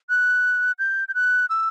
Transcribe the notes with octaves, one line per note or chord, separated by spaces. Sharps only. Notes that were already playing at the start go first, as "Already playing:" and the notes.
F#6
G6
G6
F#6
E6